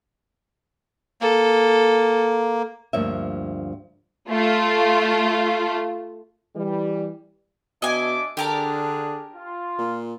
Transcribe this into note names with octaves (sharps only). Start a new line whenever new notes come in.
A#3 A4
D2 G2 F3 A#3 E5
A3 F4
E3 G3
B2 D4 D#5 E5 G#5 D6
D3 D4 G4 G#4 A#4 A5
F4
A#2